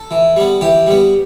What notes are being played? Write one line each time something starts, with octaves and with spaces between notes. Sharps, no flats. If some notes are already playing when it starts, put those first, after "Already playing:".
Already playing: A4
E3
G3 B3
E3 G4
G3 B3